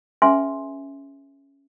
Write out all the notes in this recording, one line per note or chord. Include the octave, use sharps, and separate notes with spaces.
C#4 G#4 B4 E5 G#5 C6